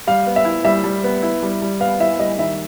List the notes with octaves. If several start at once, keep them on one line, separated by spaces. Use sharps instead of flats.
G3 F5
B3
E5
E4
G3 E5
G3
B3
E4
G3
G3
B3 F5
E4 E5
G3 D#5
D#3 E5